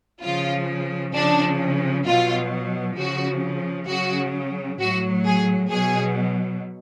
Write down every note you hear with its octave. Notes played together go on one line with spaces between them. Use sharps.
C#3 F3 F4
C#3 F3 D4
B2 F#3 F4
C#3 F3 F#4
C#3 F#3 F#4
A2 F#3 F#4
G#4
B2 F#3 G#4